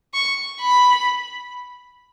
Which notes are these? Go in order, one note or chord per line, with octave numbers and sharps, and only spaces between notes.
C#6
B5